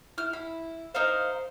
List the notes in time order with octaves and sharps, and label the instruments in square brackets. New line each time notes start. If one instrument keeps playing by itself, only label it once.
[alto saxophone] E4 [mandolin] F6
[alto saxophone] E4 [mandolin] B5
[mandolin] D#4 A#4 F5 [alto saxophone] C5